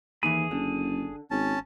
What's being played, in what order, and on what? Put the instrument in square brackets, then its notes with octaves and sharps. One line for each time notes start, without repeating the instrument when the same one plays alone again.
[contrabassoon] D#2 [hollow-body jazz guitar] E3 B5 [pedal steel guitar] G#4
[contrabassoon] F#1 [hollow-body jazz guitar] D3
[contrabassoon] G#1 [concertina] C#4 A5